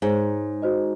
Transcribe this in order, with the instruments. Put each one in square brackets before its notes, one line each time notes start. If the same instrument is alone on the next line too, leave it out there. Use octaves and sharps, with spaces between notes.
[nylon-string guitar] G#2 [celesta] G#4 C#5 G#5
[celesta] F#4 C5 D#5